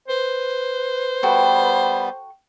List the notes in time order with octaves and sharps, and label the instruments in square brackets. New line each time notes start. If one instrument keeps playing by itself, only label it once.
[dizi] B4 [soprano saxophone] C5
[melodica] G3 B3 [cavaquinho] F#4 A4 G5